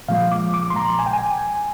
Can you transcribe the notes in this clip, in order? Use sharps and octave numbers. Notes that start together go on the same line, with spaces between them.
A#2 F3 G#3 F5
D6
D6
C6
A#5
G#5
G5
G#5